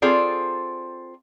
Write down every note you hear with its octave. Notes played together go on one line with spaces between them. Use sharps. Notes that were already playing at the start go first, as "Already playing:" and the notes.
C4 F4 G#4 A4 C5 D5